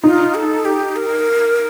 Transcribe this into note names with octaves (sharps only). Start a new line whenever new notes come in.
D#4 F4
A4
G4
A#4